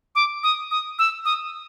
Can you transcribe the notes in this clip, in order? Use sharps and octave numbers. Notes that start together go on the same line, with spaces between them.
D6
D#6
D#6
E6
D#6